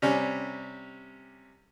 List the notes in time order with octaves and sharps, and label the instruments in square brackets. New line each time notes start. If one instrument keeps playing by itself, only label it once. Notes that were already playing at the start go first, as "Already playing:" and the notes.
[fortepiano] C3 G3 C#4